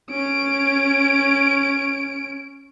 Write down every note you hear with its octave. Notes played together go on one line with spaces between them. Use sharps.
C#4 D7